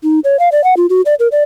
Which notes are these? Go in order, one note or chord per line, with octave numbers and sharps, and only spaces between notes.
D#4
C#5
F5
D5
F#5
F4
F#4
D5
A#4
D5